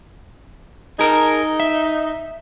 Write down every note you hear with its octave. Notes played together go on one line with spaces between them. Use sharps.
D#4 G#4 A#4
E5